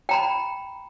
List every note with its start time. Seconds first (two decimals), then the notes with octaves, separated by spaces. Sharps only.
0.09 G5 A#5 B5